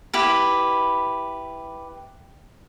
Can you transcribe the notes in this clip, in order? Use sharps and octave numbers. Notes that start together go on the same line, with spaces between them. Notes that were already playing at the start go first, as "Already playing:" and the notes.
E4 G4 B4